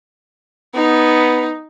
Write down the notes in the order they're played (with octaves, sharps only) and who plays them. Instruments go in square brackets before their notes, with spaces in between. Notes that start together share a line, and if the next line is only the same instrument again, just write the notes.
[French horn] B3 [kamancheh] D#4